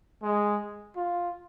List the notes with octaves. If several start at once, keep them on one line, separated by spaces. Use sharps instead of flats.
G#3
F4